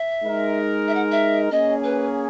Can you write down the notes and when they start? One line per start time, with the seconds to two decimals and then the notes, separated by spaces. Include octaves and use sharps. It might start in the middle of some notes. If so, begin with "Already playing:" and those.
Already playing: E5
0.23 G#3 D#4 A#4
0.87 E5
0.94 F#5
1.11 E5
1.51 A#3 C#4 G#4 D#5
1.83 B4